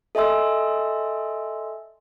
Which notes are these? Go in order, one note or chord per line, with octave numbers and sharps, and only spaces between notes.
A4 D#5 E5 G#5 C6 E6